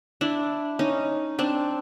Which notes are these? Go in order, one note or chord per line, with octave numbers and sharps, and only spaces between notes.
D4 E4
C#4 D#4
C4 D4